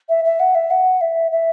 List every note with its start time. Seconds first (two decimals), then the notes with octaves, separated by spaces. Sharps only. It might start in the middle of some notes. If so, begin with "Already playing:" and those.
0.09 E5
0.25 E5
0.40 F#5
0.55 E5
0.71 F#5
1.01 E5
1.31 E5